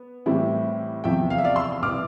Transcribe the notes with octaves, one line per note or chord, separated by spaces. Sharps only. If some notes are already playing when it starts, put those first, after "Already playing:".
Already playing: B3
A2 E3 G3 C4 E4
E2 C3 F3 E5 G5
F5
E5
D5 F5
C6 E6
C2 B2 B3 E4 D6 F6